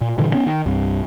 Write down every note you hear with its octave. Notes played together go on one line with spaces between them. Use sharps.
A#2
G2 A#2 D3 E3
B3 C#4
D#3
C2 G2